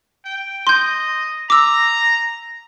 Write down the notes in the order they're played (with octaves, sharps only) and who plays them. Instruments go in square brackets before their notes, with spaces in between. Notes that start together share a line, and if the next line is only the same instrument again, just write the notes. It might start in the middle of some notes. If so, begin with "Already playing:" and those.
[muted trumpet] G5
[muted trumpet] D#5 [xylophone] C6 G6
[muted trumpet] A#5 [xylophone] D6 E6